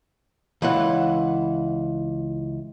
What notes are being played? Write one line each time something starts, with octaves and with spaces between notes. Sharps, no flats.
C#2 E3 F#5